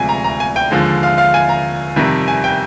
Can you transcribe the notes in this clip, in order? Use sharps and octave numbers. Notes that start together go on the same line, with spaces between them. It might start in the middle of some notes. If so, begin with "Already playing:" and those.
Already playing: D2 C3 F3 G#3 G#5
A#5
A#5
G#5
G5
D#2 D3 F3 G#3
F5
F5
G#5
A#5
F2 C3 D#3 G3
G#5
G5